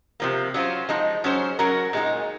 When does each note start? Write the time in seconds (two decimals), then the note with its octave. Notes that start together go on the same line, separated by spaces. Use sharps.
0.20 C3 F3 A#3
0.54 F#3 C#4 F4 C5
0.89 F3 G#3 D#4
1.24 F#3 C#4 G#4 C5
1.59 F#3 C#4 F#4 A#4
1.93 A#2 G#3 D#4